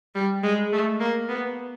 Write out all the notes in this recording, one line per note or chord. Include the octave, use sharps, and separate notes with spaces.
G3
G#3
A3
A#3
B3